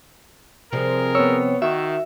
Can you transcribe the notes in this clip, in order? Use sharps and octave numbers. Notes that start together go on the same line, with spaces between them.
C3 F3 G3 G#4 A#4
B3 C#5 E6
D#3 F#4 E5